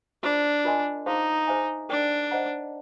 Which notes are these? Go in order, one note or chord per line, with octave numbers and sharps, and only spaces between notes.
D4 F4 G#4 C5 E5
F4 A#4 D#5 G#5 C6
D#4 G#4 C5 F5 A5 C6
G#4 C5 E5 G#5
D4 A#4 D5 G5
C5 D#5 F#5 A#5